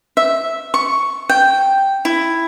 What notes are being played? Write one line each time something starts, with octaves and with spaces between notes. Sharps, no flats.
E5
C#6
G5
E4